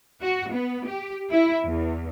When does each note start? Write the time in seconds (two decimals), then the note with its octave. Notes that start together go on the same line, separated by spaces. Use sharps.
0.21 F#4
0.52 B3
0.86 G4
1.31 E4
1.64 E2